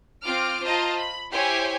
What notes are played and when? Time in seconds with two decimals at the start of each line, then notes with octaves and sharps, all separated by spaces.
0.23 C4 F4 D6 F6
0.63 F4 C5 D#5 A5 A#5
0.96 B5
1.32 E4 G4 C5 C#5 G#5 C6